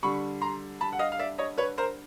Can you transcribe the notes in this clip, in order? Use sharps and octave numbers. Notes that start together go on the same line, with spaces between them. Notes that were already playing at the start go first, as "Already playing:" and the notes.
D3 G3 B5 C#6
A#5 C6
A5 B5
F#5
D#5 F5
F5
D5 E5
C#5 D#5
B4 C#5
A#4 C5